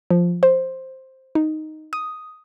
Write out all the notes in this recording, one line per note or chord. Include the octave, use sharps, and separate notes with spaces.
F3
C5
D#4
D#6